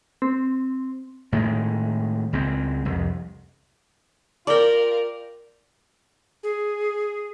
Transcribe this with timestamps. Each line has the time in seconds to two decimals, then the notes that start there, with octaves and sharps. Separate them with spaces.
0.22 C4
1.32 A2 D#3 G#3
2.33 C#2 G#3 C4
2.85 C2 F2
4.47 F4 A#4 D5 G5
6.43 G#4